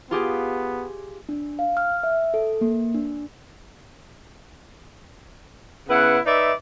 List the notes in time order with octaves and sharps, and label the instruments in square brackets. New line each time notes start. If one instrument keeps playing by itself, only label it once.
[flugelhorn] B3 [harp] F4 G4 G#4
[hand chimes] D4
F5
F6
E5
A4
A#3
D4
[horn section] C#3 B3 E4 B4 F#5
D#4 B4 D5 E5